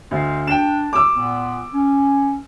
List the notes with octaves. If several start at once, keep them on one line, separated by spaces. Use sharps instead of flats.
D2 C5 D#5 F5
D4 G5 E7
D6 E6
A#2 B3
C#4